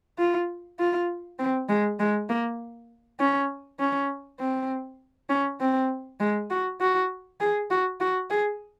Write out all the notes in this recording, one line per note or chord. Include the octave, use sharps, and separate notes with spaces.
F4
F4
C4
G#3
G#3
A#3
C#4
C#4
C4
C#4
C4
G#3
F#4
F#4
G#4
F#4
F#4
G#4